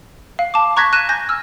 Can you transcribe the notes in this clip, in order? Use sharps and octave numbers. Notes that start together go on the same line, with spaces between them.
F5
A5 D6
A#5 C#6 F#6 G#6 A#6 B6
F#6 A#6 D#7 E7
G#5 G6 A#6
E6 F6